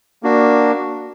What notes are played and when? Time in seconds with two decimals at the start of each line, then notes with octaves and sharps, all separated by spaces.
0.23 A#3 D4 F#4